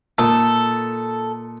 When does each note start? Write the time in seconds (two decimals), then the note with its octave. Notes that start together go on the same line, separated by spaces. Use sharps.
0.18 A#2 D#4 A4